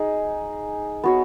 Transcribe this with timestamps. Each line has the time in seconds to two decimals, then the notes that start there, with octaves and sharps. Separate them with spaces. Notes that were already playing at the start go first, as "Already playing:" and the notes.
Already playing: D#4 G#4
1.04 B3 F#4 C#5